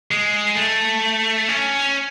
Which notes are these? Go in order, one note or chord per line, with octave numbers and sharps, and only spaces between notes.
G#3
A3
C#4